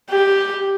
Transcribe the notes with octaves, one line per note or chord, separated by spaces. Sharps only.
G4